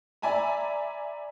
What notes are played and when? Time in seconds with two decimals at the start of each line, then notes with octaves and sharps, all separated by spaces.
0.22 D5 E5 G#5 A#5 B5